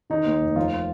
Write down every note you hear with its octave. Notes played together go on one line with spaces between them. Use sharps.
D#3 D#4
D#2
F1
F3 F4